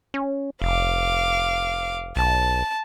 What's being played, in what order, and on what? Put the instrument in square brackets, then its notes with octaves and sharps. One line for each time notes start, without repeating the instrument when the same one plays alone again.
[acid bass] C#4
[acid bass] F1 [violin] F5 D6
[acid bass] B1 [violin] A5